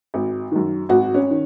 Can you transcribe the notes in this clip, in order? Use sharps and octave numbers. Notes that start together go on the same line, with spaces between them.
G#1
F#2 D#3
G#1 F#4
C#4
D#3